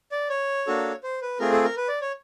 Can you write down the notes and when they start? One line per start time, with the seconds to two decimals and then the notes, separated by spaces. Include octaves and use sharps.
0.12 D5
0.30 C#5
0.67 A#3 D4 F#4 A4
1.03 C5
1.22 B4
1.40 A3 C4 F4 G#4 A#4
1.52 A4
1.64 A#4
1.77 B4
1.88 D5
2.01 C#5